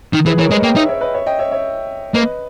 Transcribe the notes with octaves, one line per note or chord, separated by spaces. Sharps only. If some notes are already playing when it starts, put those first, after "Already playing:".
D#3
E3 G#4 B4
E3 A#4 C#5
G#3 B4 D#5
A#3 D#5 G5
D#4 C#5 E5
C#5 E5
B4 D#5
C#5 E5
D#5 G5
C#5 E5
C#5 E5
A#3 B4 D#5